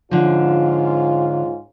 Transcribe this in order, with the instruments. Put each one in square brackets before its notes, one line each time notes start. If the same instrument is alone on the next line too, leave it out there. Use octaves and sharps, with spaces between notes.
[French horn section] G#2 C#4 F4 [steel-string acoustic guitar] D3 F3